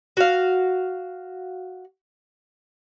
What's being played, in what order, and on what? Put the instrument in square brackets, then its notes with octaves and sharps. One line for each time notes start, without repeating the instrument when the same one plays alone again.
[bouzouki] F#4 F5